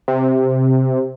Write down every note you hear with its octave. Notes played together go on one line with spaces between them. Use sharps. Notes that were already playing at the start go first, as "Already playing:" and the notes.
C3